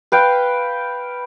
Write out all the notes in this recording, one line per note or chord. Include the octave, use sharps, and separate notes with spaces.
B4 F5 G5